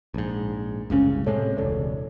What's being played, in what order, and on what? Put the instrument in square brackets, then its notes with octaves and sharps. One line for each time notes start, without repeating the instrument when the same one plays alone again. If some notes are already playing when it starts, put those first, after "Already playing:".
[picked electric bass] A#1 G#2
[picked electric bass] F#1 C2 C#3 [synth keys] G#3 C#4
[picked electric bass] A2 C3 G#3 [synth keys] A4 C#5
[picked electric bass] E1 C#2 [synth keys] A4 C#5 D5